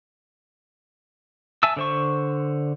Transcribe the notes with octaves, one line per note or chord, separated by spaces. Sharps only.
E5 G#5 A5 E6
D3 C5 C#6